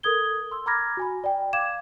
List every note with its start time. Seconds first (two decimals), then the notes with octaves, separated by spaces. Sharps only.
0.03 A4 A#4 D#6 G#6 G7
0.51 C6 E6
0.66 A#5 B5 D6 F6 G#6 A#6
0.97 F#4 G#5 B5
1.24 D5 G5
1.53 F5 D6 G#6 E7